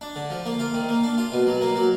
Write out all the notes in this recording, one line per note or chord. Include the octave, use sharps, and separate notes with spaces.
D4
D3
F3
A#3
F4
D#3
A#3
D4
F4
B2
F#3
A#3
F#3